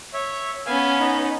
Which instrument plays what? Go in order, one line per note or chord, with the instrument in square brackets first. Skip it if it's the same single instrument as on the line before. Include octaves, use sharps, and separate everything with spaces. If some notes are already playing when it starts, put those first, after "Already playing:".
[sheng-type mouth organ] C#5 E5
[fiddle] B3 C#4 [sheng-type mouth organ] F5 G#5
[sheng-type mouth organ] D#4